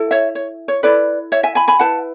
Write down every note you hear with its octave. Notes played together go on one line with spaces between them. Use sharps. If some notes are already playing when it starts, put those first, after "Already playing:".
Already playing: E4 A4
C#5 E5
C#5
C#5
E4 A4 B4 D5
C#5 E5
E5 G#5
G#5 B5
G#5 B5
E4 B4 F#5 A5